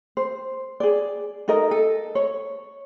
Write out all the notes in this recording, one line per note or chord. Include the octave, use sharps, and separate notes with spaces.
C5
G#4 D5
D#4 A4 A#4 D#5
A4
C#5